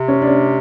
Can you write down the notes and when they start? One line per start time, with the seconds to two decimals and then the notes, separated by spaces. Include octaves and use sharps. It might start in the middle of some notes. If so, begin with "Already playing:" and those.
Already playing: C3
0.08 C#4
0.22 D4
0.27 C#4